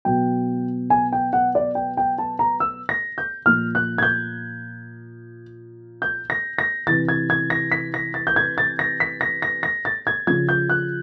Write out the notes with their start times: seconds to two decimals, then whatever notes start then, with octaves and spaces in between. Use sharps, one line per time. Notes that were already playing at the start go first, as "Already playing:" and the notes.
0.05 B2 F#3 G5
0.90 G#5
1.12 G5
1.33 F#5
1.55 D5
1.75 G5
1.97 G5
2.18 A5
2.39 A#5
2.60 E6
2.89 A#6
3.18 G6
3.46 A#2 F3 F6
3.75 F#6
3.98 G#6
4.03 G6
6.02 G6
6.30 A#6
6.58 A#6
6.87 C3 E3 A6
7.08 G#6
7.30 G#6
7.50 A#6
7.72 B6
7.94 A#6
8.14 A6
8.27 G6
8.36 G#6
8.58 A6
8.79 A#6
9.00 B6
9.21 A#6
9.42 A#6
9.63 A#6
9.85 A6
10.07 G#6
10.27 C#3 F3 G#6
10.49 G6
10.69 F#6